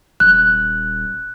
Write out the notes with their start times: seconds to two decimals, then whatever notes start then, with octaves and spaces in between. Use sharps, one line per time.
0.20 D#1 F#6